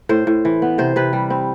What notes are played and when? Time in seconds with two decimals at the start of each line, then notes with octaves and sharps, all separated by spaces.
0.09 A2 C5
0.27 A2
0.45 E3
0.62 B3
0.78 C3 C5
0.96 C3 B4
1.13 G3
1.30 C4